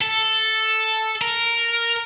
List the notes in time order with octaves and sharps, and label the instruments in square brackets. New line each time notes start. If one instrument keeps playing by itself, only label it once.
[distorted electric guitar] A4
A#4